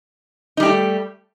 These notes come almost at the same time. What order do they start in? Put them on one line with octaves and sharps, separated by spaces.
D#4 G3 G4 A3